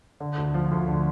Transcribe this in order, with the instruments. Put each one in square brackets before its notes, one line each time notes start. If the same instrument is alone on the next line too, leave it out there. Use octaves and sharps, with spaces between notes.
[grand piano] D3
D2
F3
D2
D3